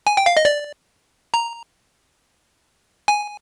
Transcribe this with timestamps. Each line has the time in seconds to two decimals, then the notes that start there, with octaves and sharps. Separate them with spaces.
0.07 G#5
0.17 G5
0.26 F5
0.37 D#5
0.45 D5
1.34 A#5
3.08 G#5